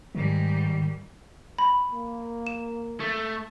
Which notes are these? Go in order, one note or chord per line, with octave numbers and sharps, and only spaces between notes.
G#2 D#3 G3
B5
A#3
E7
A3